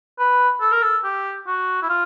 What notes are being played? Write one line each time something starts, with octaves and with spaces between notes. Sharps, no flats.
B4
A4
A#4
A4
G4
F#4
E4
F4